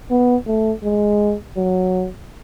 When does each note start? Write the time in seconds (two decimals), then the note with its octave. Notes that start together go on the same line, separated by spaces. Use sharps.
0.11 B3
0.47 A3
0.84 G#3
1.57 F#3